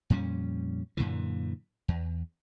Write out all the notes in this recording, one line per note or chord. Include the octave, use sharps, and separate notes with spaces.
F2 A#2 G3 C#4
F#2 A#2 D3 E3
E2